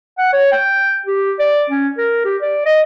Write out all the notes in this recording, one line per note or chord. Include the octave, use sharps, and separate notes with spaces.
F#5
C#5
G5
G4
D5
C#4
A#4
G4
D5
D#5